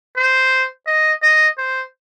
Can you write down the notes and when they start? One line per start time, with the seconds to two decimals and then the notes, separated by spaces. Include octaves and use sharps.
0.17 C5
0.87 D#5
1.22 D#5
1.58 C5